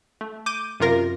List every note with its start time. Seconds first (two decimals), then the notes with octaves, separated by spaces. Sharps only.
0.21 A3
0.46 D6 G6 D#7
0.80 F#2 C3 F4 A#4 A#6